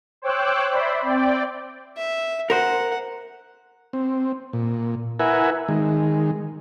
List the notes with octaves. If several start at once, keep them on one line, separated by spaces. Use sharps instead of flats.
C5 C#5 G5 D6 E6 F#6
C5 D5 E5 B5
C4 D5 G5
E5
A#4 C5 F#5
C4
A#2
E4 A#4 B4 E5 F#5 G#5
D#3 G#3